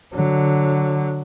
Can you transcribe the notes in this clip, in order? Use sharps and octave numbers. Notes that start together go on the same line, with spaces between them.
D3 F#3